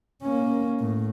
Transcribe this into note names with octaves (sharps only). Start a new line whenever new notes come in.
A#3 C#4
A2